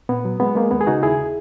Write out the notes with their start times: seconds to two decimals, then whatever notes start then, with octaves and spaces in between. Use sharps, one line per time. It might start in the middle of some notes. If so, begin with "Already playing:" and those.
0.09 A#2 B3
0.25 F#3
0.40 G#3 B3
0.55 G#3 A#3
0.71 D#2 B3
0.81 G#4
0.87 C#3 D#4 F#4
1.03 D#2 E4 G#4